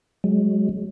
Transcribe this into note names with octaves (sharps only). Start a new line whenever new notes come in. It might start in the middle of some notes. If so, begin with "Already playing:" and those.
F#3 G#3